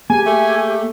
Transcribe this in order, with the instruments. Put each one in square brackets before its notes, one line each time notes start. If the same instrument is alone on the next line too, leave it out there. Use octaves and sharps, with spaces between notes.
[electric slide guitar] A#3 G#4 [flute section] G4 [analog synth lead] G#5
[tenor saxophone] A3